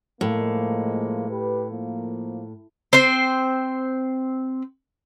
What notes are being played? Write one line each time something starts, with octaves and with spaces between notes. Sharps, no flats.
A2 F3 G#3 A#3
G4 B4
F3 A#3
C4 C5